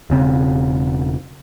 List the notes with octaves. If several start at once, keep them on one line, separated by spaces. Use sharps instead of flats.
E1 C#3 C4